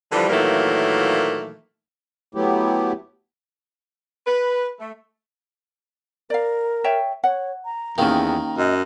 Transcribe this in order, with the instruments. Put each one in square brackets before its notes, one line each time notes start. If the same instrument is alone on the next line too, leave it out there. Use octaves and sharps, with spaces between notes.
[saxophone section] D3 E3 F3 G3
A#2 D#3 E3 F#3 A3 A#3
[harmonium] F#3 A3 B3 E4 G4
[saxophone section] B4
A3
[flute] A#4 [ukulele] D5 F5
[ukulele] C#5 E5 G5
[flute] C#5 [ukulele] F#5
[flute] A#5
[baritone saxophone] E2 [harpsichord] D#3 A#3 [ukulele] C#4 G4
[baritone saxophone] F#2 [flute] D#5